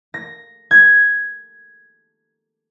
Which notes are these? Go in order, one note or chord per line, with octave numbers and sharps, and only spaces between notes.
A#6
G#6